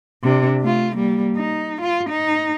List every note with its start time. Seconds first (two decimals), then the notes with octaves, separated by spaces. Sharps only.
0.23 C3 D4
0.61 A3 F4
0.96 G3 A#3
1.36 D#4
1.82 F4
2.10 D#4